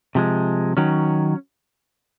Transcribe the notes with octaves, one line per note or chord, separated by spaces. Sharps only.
C3 F3 G#3
D#3 F#3 C#4